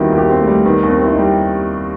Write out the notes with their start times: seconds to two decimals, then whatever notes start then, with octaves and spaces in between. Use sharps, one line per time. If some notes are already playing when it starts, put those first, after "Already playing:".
Already playing: D#2 D#3 G3 B3 C4 D#4 E4 F#4
0.12 D#2
0.18 G4
0.29 C4
0.41 A3
0.47 G3
0.65 D#3 B3
0.83 D#2
0.89 C4
1.01 C4 E4
1.13 D#4
1.19 G3